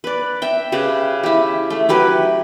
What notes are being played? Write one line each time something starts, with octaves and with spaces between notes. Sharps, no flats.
B4 D5
E5 G5
C#3 G4 B4
E4 G4
A3
F#3 G4 B4 G#5